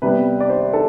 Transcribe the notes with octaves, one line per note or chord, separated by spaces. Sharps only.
C3 G3 B3 B4
D5
C5
A4